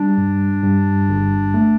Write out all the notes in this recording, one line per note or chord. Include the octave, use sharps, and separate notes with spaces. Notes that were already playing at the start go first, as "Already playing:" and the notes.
Already playing: G3 D4
G2
G2
G1
A3